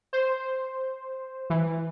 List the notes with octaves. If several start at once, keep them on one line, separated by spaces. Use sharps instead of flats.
C5
E3